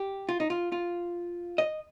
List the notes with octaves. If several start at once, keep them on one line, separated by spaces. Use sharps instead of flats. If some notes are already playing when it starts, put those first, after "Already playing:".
Already playing: G4
F4
D#4
F4
F4
D#5